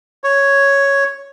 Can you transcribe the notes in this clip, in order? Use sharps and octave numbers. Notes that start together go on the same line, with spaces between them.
C#5